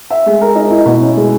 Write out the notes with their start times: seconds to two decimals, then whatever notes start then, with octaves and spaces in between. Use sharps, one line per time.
0.10 E5
0.26 G#3
0.41 A#4
0.56 D#4
0.70 E4
0.86 B2
1.01 C#4
1.17 G#3